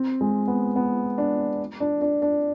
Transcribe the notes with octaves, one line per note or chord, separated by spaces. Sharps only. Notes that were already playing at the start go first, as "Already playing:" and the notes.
Already playing: C4
G#3
B3
B3
D4
D4
D4
D4